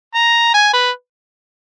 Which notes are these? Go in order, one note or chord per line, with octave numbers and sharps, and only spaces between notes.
A#5
G#5
B4